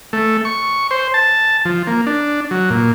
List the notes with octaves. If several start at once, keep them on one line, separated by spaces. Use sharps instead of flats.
A3
C#6
C5
A5
F3
A#3
D4
F#3
A#2